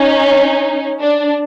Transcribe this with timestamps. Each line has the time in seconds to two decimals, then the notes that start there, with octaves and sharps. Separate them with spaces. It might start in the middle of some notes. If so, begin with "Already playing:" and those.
Already playing: C#4 D#4
0.99 D4